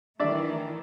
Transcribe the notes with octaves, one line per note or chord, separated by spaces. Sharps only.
D#3 E3 A3 D4 D5 E5